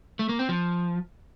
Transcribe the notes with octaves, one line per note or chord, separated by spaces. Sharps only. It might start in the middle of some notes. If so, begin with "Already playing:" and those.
A3
A#3
C4
F3